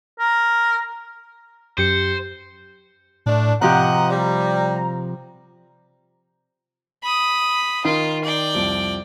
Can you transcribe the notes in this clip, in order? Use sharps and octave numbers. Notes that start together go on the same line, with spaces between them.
A#4
F#2 G4 C5 C#7
A2 A3 D4
C3 F3 G4 D#5 F#5 A#5
G3
B5 D#6
D#3 D#4 F4
D5 G5
C2 F2